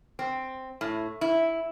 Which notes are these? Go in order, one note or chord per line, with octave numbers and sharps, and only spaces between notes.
C4
A2
E4